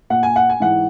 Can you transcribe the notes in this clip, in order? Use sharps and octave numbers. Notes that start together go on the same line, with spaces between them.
A#2 F#5
G#5
F#5
G#5
G#2 E3 F#5